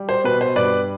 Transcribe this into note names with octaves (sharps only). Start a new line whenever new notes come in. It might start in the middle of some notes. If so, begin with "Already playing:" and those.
Already playing: G3
C5
B2 B4
C5
G2 B4 D5